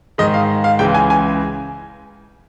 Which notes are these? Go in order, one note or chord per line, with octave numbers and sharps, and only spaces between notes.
G#2 D#3 G#3 D#5
F5
F5
C#2 C#3 E3 G#3 G5
G#5
G#5